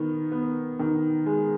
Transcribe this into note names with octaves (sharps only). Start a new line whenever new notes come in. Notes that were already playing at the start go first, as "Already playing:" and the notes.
Already playing: D#3 B3
B3
D#3
G#3